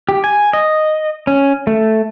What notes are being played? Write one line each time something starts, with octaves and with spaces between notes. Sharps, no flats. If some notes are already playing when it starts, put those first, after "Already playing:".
G4
G#5
D#5
C#4
A3